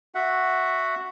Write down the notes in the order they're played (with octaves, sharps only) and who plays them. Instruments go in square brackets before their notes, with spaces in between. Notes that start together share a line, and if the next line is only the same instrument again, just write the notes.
[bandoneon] F#4 E5 F#5